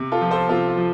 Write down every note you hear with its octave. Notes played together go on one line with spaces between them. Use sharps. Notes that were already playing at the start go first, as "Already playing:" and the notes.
Already playing: C3
F4 A4
F3
A4 C5
C3 F4 A4
F4
F3